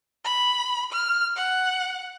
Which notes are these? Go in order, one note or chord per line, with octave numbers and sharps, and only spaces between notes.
B5
F6
F#5